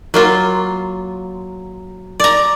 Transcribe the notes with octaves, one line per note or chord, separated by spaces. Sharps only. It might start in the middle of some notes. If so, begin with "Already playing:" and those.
F#3 A#3 F4
D5 A#5